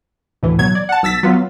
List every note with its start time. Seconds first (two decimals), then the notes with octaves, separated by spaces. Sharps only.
0.43 D2 A2 E3
0.59 B2 F#3 G#6
0.75 D5
0.89 F#5 A5
1.03 B1 E6 A6 B6
1.23 F#3 B3 F4